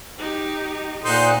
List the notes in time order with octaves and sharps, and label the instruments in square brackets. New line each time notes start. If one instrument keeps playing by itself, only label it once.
[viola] D#4 G4
[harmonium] A#2 [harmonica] D#4 C5 [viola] A4 F#5